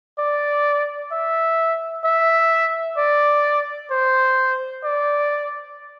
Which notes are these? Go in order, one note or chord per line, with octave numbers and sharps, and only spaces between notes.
D5
E5
E5
D5
C5
D5